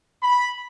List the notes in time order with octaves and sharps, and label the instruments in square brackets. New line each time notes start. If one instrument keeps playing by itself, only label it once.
[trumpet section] B5